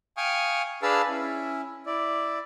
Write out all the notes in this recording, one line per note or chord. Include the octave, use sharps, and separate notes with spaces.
F5 G5 G#5 C#6 D#6 F6
D4 G#4 B4 F5 A5 E6
C#4 E4
E4 D5